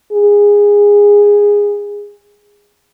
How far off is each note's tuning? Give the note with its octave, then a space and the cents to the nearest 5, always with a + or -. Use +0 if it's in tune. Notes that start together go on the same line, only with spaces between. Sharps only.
G#4 -15